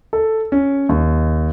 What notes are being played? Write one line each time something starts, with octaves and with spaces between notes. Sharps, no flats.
A4
C#4
D#2